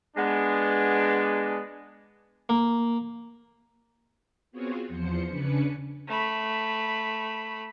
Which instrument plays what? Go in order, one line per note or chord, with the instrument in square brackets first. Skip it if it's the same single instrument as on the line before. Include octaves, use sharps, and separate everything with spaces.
[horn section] G#3 B3 D4
[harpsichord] A#3
[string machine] B3 C4 F4 F#4 G#4 C#5
E2 F3 C5 C#7
C#3 C#4 D4 B4 C#7
[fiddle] A3 B5